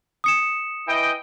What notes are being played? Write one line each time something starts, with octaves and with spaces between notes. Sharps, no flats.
D#6 C#7 E7
E3 D#5 G5